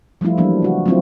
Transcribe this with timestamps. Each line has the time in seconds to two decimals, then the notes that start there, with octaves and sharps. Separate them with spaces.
0.21 F3 G3 A3 E4 F4
0.38 E3 F#3 G3 A#3 B3 D4
0.62 C#3 F#4
0.86 F#3 A3 C4 E4 F4